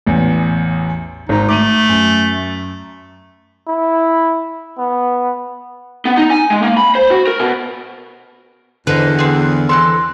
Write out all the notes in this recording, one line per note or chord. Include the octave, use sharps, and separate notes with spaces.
A1 E2
G#1 G#2 D#4
A3 D6 D#7
F#2
E4
B3
B3
D#4
G#5
G#3
A#3
B5
C5
F#4
A#4
B2
E2 D3 B4 C5 D#5 F#6
C4 G#4
E3 C4 A4 C6 F#6